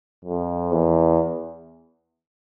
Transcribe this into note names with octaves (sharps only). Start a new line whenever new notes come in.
F2
E2